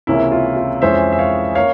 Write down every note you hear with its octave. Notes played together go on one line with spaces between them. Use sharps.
C#2 C3 E3 A#3 C#4 E4
F4
F4
F2 E3 G#3 C#4 C5 E5
E5
C#5 F5
A#3 C#4 C#5 F5